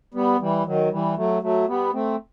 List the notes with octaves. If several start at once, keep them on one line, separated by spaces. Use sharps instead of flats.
G3 B3
E3 G3
D#3 F#3
E3 G3
F#3 A3
F#3 A3
G3 B3
A3 C4